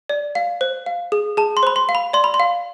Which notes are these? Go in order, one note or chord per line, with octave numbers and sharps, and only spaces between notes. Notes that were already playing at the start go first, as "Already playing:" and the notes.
D5
F5
C5
F5
G#4
G#4 A5
C6
C5 B5
C6
F5
B5
D5 C6
B5
C6
F5